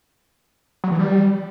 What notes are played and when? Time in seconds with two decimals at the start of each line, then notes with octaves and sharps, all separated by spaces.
0.84 F#3
0.91 E3
0.99 G3